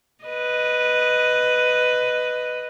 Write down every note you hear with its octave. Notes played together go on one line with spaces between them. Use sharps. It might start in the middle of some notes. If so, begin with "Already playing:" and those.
B4 D#5